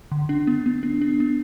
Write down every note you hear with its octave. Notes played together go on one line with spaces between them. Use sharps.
D3
D4
B3
B3
D4
D4
B3